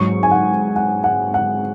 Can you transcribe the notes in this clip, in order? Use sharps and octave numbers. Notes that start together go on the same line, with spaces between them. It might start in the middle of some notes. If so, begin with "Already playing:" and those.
Already playing: G#2 F#3 C#6
G#5
F#5
F#5
F#5
F#5